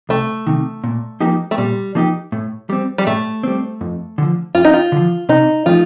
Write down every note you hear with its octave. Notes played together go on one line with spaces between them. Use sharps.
C2 A3
C3 D#3
A#2
F3 A#3 D#4 G4
A3
A#2 G3
F3 A#3 D#4 G4
A2
G3 C4
G3
A2 A3
G3 C4
F2
D3 F3
F2 F4
D#4
F4
D3 F3
C3 D#4
F3 A3 D#4 F4